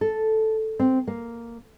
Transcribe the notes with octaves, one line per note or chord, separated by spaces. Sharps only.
A4
C4
A#3